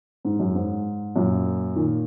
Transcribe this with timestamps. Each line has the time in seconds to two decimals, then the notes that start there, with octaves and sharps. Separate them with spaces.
0.25 G#2
0.40 F#2
0.55 G#2
1.16 F#2 A#2
1.76 A#2 D#3